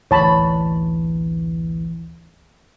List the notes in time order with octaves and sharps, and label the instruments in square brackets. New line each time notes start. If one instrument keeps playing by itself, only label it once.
[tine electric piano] A1 D2 E3 [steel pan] C#5 A5 B5